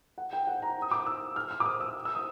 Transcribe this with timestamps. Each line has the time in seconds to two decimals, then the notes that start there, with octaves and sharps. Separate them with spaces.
0.18 F#5
0.33 G5
0.47 F#5
0.62 A#5
0.82 D#6
0.91 D6
1.06 E6
1.36 F6
1.51 F6
1.60 D6
1.66 D#6
1.80 E6
2.05 E6
2.15 D#6